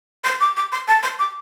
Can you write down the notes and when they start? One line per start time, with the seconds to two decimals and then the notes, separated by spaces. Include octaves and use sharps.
0.24 C6
0.40 D6
0.56 D6
0.72 C6
0.88 A5
1.03 C6
1.19 D6